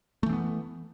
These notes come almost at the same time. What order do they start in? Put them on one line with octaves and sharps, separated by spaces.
A3 E3 C4 B3